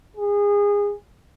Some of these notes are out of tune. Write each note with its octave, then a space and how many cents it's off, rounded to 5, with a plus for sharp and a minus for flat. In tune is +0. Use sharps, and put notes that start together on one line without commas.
G#4 -25